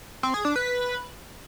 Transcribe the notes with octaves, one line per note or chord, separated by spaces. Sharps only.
C4
G#4
D4
B4